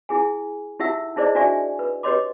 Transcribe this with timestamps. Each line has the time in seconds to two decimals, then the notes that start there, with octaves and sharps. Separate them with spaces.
0.09 E4 G#4 G#5
0.79 D#4 E4 G4 E5 F#5 E6
1.16 D#4 E4 G#4 C5 D5 D#5
1.35 D4 F#4 D5 E5 G#5 C#6
1.79 B4
2.03 G4 B4 C#5 D#5 C6 D6